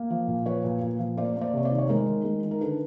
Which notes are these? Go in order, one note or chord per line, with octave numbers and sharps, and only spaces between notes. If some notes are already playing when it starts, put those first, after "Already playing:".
Already playing: A#3
F3
A#2
F3 B4 C#5
A#2
A#2
F3
A#3 C5 D5
A#3
C5 D5
C3 C#5
C5 D5
D#3
C#5
G#3 A#4 C5
D#3
G#3
D#3
A#4
D3 A4 B4